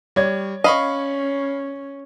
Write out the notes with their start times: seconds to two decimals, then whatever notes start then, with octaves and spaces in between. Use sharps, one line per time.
0.16 G3 C#5 D5 G#6
0.64 C#4 D#5 F5 B5 C#6